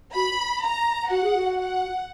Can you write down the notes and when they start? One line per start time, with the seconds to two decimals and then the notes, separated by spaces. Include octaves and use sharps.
0.14 F#4 B5
0.62 A#5
1.10 F#4 F#5
1.23 G#4
1.36 F#4
1.58 F#5